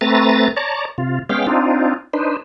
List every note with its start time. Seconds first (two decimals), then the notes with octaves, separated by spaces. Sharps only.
0.01 A3 C4 B4 A#5 A6
0.57 C#5 D5 A5 A#5
0.98 C3 F4
1.29 G#3 B3 C#4 F5 G5
1.47 C4 D4 D#4 F4
2.13 D4 D#4 B4 C5